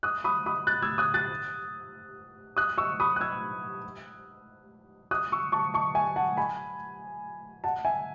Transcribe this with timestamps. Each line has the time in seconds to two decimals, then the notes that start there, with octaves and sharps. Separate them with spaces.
0.03 D#6 F#6
0.24 B5 D#6
0.46 B5 D#6
0.67 F#6 A6
0.82 E6 G#6
0.98 D#6 F#6
1.14 F#6 A6
2.57 D#6 F#6
2.78 C#6 E6
3.00 B5 D#6
3.16 F#6
3.21 E6 G#6
5.11 D#6 F#6
5.32 C#6 E6
5.52 A5 C#6
5.74 A5 C#6
5.95 E5 G#5
6.16 F#5 A5
6.37 G#5 B5
7.64 F#5 A5
7.85 E5 G#5